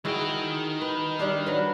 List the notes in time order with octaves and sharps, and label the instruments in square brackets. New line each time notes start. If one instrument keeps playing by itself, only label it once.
[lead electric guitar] D#3 G5 [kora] E4 F#4 G#4
[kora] B4
G3 D4 F5
F#3 B4